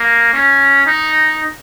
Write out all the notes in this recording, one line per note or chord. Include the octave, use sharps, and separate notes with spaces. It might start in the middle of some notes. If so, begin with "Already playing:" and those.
Already playing: A#3
C#4
D#4